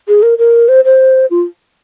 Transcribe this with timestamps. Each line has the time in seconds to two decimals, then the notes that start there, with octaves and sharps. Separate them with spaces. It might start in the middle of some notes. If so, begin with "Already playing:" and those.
0.08 G#4
0.23 A#4
0.38 A#4
0.69 C5
0.85 C5
1.31 F4